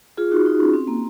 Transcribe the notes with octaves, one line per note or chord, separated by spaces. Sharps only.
F4 G#4
D#4 F#4
D#4
C#4
C4
A#3